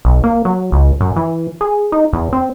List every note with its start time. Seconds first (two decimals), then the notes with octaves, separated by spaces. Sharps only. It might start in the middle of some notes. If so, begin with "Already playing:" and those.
0.05 B1
0.24 A#3
0.45 F#3
0.72 C#2
1.01 F#2
1.16 E3
1.61 G#4
1.92 D#4
2.13 E2
2.33 C4